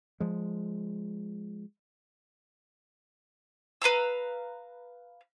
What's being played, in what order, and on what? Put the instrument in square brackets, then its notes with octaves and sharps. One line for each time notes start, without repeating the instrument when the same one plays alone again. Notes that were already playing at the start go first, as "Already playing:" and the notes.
[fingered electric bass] F3 G#3
[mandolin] B4 F5 A#5 E6